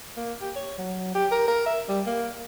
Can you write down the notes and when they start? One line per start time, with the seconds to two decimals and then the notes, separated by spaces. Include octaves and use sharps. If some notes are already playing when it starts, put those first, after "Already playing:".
0.17 A#3
0.41 G4
0.56 C#5
0.78 F#3
1.15 G4
1.31 A#4
1.48 A#4
1.66 E5
1.89 G3
2.06 A#3